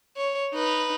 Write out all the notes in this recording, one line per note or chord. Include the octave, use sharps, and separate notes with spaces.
C#5
D#4 B4